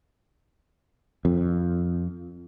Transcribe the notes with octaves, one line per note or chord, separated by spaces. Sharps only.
F2